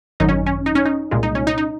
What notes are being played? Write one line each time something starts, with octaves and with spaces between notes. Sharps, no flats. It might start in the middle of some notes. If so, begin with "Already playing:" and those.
G#1 F#2 D#3 F#3 D#4
C#4
C#4
D#4
C#4
D#4
C2 A#2 G#3 F4
D#4
C#4
D#4
D#4